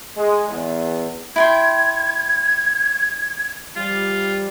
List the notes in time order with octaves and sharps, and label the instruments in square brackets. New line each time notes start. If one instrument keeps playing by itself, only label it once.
[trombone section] G#3
E2
[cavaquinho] E4 G5 C6 [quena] G#6
[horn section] F3 G3 [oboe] F4